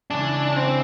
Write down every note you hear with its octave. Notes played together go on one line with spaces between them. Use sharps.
C#3 E3 G#3 D4
C4